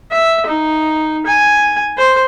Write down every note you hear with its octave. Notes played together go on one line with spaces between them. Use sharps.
E5
D#4
G#5
C5